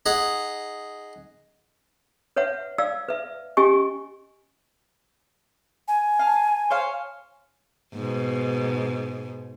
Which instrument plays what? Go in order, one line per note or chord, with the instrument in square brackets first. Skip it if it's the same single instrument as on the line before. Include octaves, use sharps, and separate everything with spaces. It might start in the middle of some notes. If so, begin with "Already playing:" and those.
[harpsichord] D#4 G#4 F#5
[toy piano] B4 C#5 E5 F#5
D5 F5 E6
B4 E5
C#4 G4 D#5 G#5 C#6
[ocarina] G#5
[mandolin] F5 A5
C5 C#5 F5
[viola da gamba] G#2 B2